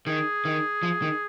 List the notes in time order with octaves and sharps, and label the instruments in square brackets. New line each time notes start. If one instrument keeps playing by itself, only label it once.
[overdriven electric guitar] D#3 [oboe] G#4
[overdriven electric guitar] D#3
F3
D#3